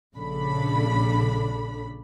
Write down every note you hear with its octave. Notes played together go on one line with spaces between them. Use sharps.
A#1 C#3 D4 A4 B5